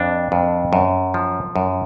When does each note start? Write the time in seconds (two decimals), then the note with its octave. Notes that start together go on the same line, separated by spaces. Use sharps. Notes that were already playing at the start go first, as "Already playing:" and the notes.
Already playing: F2 D4
0.32 F2
0.73 F#2
1.14 F3
1.56 F#2